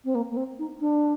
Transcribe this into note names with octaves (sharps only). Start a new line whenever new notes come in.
C4
A#3
A#3
C4
D#4
D4